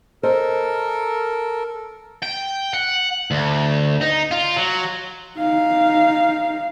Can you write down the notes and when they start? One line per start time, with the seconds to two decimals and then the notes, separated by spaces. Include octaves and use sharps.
0.23 A4 A#4 C5 D#5
2.23 G5
2.73 F#5
3.31 D2
4.01 D#4
4.31 F4
4.57 F#3
5.38 D#4 F5